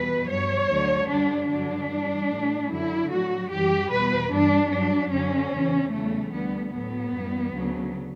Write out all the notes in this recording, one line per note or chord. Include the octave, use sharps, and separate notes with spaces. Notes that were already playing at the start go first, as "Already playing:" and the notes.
Already playing: E2 B2 G3 B4
G2 F#3 C#5
D2 D3 F#3
F#2 D3 G3 D4
G2 D3 F#3 D4
G2 E3 G3
A2 G3
F#2 D3 F#3 E4
A2 F#3 F#4
F#2 E3 G3 G4
E2 B2 G3 B4
G2 E3 G3 D4
G2 F#3 D4
F#2 D3 F#3 C#4
E2 C#3 E3
E2 C#3 E3 G3 A3
D2 D3 G3 B3
A2 F#3 B3
F#2 E3 G3
D2 C#3 F#3